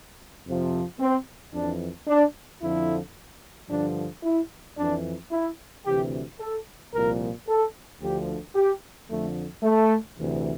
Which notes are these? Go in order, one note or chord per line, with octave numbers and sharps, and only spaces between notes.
F2 C3 F3
C4
F2 E3 D4
D4
F2 D3 F3 E4
G2 D3 F3 D4
E4
F2 E3 D4
E4
D2 C3 E3 G4
A4
C2 A#2 F3 A#4
A4
D2 D3 F3 G4
G4
F2 D3 F3 A3
A3
D2 C3 E3